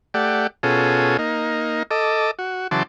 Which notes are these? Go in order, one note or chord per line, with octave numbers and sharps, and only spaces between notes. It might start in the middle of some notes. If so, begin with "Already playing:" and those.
A3 G4 D5 F#5
B2 C#4 F4 G#4 A4
A#3 D#4
A4 D#5 D6
F#4
C#3 E3 F#3 A5 C6 D6